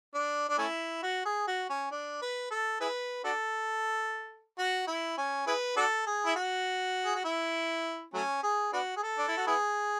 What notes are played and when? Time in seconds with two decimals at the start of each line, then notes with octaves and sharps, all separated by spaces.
0.14 D4
0.49 D4
0.58 A3 C#4 E4
1.03 F#4
1.25 G#4
1.47 F#4
1.70 C#4
1.91 D4
2.22 B4
2.51 A4
2.81 E4 G#4 B4
3.24 D4 F#4 A4
4.58 F#4
4.87 E4
5.17 C#4
5.47 E4 G#4 B4
5.76 D4 F#4 A4
6.06 G#4
6.26 E4
6.36 F#4
7.05 G#4
7.15 F#4
7.24 E4
8.14 F#3 A3 C#4
8.43 G#4
8.73 B3 D4 F#4
8.97 G#4
9.03 A4
9.18 D4
9.28 E4
9.37 F#4
9.47 B3 E4 G#4